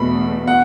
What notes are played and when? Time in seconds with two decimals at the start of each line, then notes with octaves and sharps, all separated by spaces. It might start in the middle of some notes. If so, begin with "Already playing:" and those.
Already playing: E2 B2 A3 B5
0.47 F#5